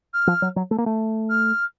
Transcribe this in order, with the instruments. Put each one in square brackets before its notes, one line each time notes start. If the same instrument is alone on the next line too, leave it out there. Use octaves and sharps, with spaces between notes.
[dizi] F6
[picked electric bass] F3
F#3
F#3
A3
A#3
A3
[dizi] F6